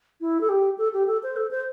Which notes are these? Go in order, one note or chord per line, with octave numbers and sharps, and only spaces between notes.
E4
A4
G4
A4
G4
A4
C5
A4
C5